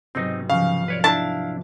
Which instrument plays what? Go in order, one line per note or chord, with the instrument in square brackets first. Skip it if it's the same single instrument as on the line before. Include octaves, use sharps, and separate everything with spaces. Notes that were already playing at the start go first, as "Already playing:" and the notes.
[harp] B1 G#2 C3 [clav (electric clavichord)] C4 D#4
[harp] G#2 F3 [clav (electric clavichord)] C#3 [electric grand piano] F5
[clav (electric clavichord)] B4 C#5 D5
[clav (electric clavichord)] D4 E4 [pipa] A5